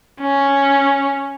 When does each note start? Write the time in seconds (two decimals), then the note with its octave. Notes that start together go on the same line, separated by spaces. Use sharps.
0.21 C#4